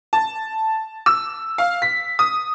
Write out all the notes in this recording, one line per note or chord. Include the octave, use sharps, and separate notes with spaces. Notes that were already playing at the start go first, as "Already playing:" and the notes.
A5
E6
F5
B6
D#6